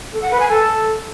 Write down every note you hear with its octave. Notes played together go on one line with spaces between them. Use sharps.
A4
F#5
B4
G#5
A4